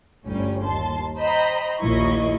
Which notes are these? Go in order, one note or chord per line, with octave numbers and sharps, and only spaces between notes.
G1 D2 G3 C#4
D#2 A5 C6
C5 D#5 G5 A#5 B5
A#1 D#2 A#2 E4 D#5 C#6